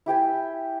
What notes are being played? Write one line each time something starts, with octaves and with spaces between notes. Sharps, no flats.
E4 G4 G5 G#5